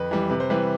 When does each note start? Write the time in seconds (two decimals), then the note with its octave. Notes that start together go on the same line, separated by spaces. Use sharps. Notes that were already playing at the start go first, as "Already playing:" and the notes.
Already playing: F2 B4
0.11 E3 G3
0.30 C3 B4
0.40 C5
0.50 E3 G3 B4